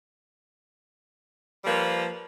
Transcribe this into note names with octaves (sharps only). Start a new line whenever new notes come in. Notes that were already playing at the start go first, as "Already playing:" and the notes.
F3 G3 A#3 B4 C5